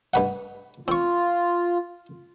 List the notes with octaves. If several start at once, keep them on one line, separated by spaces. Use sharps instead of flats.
G2 B4 F#5
C4 F4 C#6